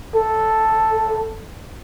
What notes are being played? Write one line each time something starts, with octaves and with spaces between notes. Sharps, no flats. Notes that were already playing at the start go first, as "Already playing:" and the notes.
A4